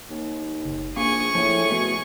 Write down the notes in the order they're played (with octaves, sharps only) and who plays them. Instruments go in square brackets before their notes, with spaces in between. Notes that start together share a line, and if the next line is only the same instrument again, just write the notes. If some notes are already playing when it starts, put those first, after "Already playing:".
[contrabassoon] D#2
[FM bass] F#1
[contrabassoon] A#1 [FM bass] A#3 [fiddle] G#4 C#6
[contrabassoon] A2 [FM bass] F3
[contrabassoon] B2 [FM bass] A3